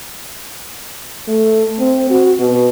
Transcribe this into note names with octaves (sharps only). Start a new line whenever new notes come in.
A3
C4
F#4
B2